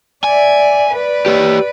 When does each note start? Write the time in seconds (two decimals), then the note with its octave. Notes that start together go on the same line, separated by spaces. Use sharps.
0.24 D5 E5 G#5
0.90 B4 D5
1.26 G4 C#5